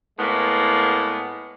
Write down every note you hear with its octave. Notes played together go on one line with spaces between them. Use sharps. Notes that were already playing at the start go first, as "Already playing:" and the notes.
A2 G#3 A#3 B3